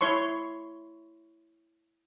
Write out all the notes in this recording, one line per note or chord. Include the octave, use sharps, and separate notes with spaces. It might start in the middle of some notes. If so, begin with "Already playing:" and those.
E4 C#5 C6 C#6